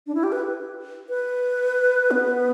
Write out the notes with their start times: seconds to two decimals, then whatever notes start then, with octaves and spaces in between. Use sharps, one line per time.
0.07 D4
0.15 E4
0.23 G4
0.32 B4
1.09 B4
2.11 B3